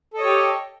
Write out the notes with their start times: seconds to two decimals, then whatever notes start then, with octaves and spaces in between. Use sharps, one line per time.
0.14 A4
0.17 D#5
0.21 C#5
0.24 G4